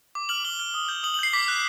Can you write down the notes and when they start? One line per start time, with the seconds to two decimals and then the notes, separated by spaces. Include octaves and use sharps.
0.15 D6
0.29 F6 F#7
0.44 D6 G7
0.59 F6
0.74 D#6
0.89 G6
1.03 D#6 F#7
1.14 F#7
1.19 G6 C7
1.33 D6 B6
1.48 F#6